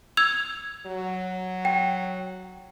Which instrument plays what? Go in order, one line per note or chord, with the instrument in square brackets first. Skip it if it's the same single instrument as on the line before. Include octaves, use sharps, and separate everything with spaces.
[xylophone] E6 G#6 F7
[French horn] F#3
[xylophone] G5